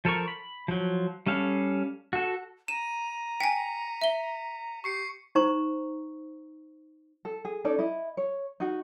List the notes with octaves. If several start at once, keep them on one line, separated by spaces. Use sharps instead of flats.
F3 A4 A#4 C#6
B5
F3 F#3
G3 C#4 A4 F5
F#4 A4
A#5 D#7 E7
G5 G#5 B6 C#7
E5 G7
G4 C#6 C7 C#7
D#4 C5 A#5 C#6
A4
G#4
C#4 D#4 A4 D5
E4 D#5
C#5
D#4 F#4